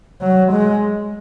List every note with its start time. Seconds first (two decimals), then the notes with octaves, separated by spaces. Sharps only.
0.21 F#3
0.53 G#3